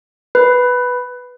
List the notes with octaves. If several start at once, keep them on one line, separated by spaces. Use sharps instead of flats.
B4